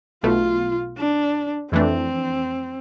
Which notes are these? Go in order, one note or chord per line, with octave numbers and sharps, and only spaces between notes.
B1 B2 A3 F4
D4
F2 E3 A3 C4 D4